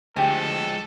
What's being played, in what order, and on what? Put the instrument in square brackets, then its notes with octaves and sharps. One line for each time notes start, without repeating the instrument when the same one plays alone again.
[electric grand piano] D2 [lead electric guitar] F3 G#3 [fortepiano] G4 G#5 [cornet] A4